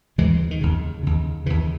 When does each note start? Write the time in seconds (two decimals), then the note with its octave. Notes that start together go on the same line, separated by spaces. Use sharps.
0.18 D#2 C#3 E3 G#3
0.51 D#3
0.61 D#2 C#3
1.03 D#2 C#3
1.46 D#2 C#3 E3